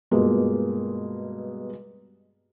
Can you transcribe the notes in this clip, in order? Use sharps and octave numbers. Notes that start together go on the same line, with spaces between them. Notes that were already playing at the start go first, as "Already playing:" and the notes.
G2 B2 G#3 A#3 F4